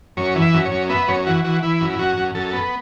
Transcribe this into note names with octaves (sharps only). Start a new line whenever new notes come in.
F#2 C#5
E3
E5
F#2
C#5
F#2
B3 E5
F#2 C#5
E3 F#4
E3 F#4
E3 E4
F#2
E4
F#2 F#4
F#2
F#2 A4
B3